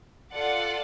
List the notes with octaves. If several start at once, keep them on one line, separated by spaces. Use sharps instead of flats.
F4 A4 D5 F#5